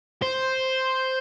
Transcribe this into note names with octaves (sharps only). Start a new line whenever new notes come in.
C5